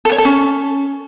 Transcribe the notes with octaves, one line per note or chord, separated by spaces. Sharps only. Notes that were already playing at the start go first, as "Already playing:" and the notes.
A4
C#5
A4
C#4